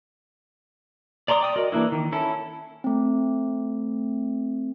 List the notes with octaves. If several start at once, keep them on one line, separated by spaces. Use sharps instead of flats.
D5 A#5 C6 D6 D#6
D5 G5 D#6
F#4 A#4 D5 D#5
E3 A#3 D4 E4
D#3
C#4 E4 A4
A3 C4